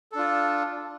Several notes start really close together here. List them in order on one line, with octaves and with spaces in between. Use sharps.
A4 D4 F4